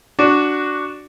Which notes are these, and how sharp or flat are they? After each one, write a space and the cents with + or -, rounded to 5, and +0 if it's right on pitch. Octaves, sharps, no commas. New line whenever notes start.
D4 +0 F#4 +0